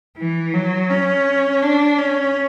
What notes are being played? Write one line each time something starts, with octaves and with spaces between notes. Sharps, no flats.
E3
F#3
C#4
D4
C#4